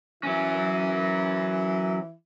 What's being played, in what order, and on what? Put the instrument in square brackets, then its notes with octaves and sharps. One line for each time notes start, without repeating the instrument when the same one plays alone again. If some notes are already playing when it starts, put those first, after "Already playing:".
[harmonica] E3 E4 [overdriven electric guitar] F#3 C#4